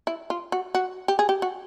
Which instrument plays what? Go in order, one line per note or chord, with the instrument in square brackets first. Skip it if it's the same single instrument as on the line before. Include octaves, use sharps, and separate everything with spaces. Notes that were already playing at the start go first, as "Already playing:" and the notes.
[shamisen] E4
F4
F#4
F#4
G4
G#4
G4
F#4